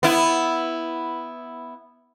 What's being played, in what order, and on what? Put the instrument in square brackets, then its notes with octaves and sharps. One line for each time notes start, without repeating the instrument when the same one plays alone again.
[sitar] B3 E4